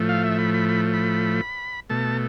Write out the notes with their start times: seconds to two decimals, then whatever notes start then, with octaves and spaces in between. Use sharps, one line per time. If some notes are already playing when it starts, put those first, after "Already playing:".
Already playing: A2 F3 A3
0.09 F5
0.24 E5
0.38 B5
0.54 B5
0.69 B5
0.93 B5
1.90 B2 A3 A5